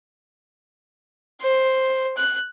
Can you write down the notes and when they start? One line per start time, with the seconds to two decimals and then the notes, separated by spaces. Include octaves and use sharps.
1.41 C5
2.17 F#6